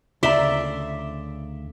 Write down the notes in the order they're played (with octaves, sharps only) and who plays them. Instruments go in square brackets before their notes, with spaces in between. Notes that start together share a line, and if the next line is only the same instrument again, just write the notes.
[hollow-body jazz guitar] D2 C#3 A#5 [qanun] D5 E5 C6